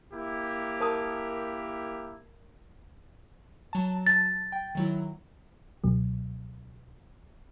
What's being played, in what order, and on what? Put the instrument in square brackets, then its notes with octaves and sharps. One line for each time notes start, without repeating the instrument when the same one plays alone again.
[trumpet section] A#3 E4 G4
[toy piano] A#4 A5 D#6
[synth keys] F#3 A5
[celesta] A6
[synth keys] G5
D#3 F#3 E4
[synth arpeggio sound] C#2 B2 F#3